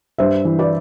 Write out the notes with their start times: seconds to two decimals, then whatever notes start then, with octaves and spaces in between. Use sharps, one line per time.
0.18 G2 C5 E5
0.45 E3
0.59 B4 D5